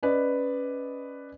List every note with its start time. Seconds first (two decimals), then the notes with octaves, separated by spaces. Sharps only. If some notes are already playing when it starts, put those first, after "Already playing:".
0.03 C#4 B4 D5 D#5